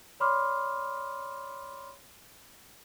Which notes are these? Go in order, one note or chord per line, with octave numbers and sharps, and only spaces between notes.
C#5 D5 B5 C6 D6 F6